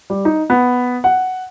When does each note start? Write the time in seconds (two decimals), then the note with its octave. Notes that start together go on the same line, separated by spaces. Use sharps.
0.10 G3
0.25 D#4
0.50 B3
1.04 F#5